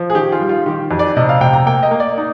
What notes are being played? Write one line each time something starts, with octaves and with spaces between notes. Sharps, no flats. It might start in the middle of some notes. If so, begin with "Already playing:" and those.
Already playing: F3
G#4
D#3 G4
F4
G3
F4
D#3 G4
F2
D5
C3 D#5
F5
C3 G5
A#5
A#3 G5
D#5
A#3
D5
D#4